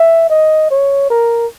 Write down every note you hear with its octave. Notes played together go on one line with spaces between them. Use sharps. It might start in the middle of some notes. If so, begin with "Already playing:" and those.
Already playing: E5
D#5
C#5
A#4